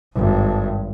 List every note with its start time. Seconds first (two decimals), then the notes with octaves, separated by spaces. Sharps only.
0.14 G#1 G2